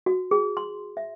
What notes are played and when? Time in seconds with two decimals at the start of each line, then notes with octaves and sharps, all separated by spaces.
0.06 F#4
0.31 G#4
0.57 C6
0.97 E5